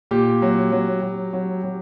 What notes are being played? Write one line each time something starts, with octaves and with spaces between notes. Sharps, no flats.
A#2 G4
F#3
F#3
F#3
F#3
F#3